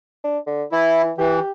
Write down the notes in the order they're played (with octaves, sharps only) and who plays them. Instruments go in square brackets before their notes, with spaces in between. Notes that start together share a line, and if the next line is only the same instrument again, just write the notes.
[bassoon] D4
D3
[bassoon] E3 [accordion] E4
[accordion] E3 [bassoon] G4